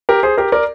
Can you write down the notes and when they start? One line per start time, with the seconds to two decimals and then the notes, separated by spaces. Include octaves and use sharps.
0.09 G4 A#4
0.23 G#4 C5
0.38 G4 A#4
0.52 A#4 D5